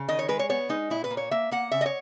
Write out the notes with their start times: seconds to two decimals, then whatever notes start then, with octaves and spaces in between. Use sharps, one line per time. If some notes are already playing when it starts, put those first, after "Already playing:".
Already playing: C#3
0.09 D#3 D#5
0.19 C#5
0.28 G#3 B4
0.39 C#5
0.49 B3 C#5
0.69 G#3 D#4
0.90 A#2 E4
1.04 B4
1.11 A#3
1.17 C#5
1.31 A#3 E5
1.51 A#3 F#5
1.71 C#3 E5
1.81 D#5
1.86 C#5